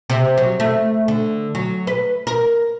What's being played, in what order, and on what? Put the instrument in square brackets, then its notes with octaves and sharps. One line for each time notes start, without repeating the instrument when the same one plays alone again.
[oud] C3
F#3
A3
D3
F#3
B4
A#4